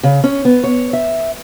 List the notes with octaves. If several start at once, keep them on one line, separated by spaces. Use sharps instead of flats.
C#3
C#4
B3
C#5
E5